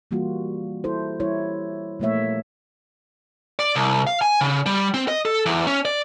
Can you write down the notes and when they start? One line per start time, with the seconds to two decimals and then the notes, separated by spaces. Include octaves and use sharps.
0.11 E3 G3 A#3 F4 F#4
0.84 E4 A4 C5
1.20 G3 E4 C#5
2.00 A#2 F3 A3 A#3 C#5 E5
3.59 D5
3.75 C2
4.07 F5
4.22 G#5
4.41 C#3
4.66 G3
4.94 C4
5.08 D#5
5.25 A4
5.46 E2
5.67 C#4
5.85 D5